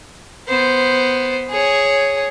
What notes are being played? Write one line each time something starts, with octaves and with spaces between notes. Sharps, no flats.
B3 C5
G#4 C#5